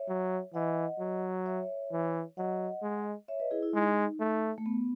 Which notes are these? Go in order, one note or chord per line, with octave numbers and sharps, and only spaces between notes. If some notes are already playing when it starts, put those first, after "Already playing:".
Already playing: C#5 E5
F#3
E3 D#5 F#5
F#3
C#5 E5
E3
F#3 D#5 F#5
G#3
C#5 E5
B4 D#5
E4 G#4
E4
G#3 D#4
A3
A3
B3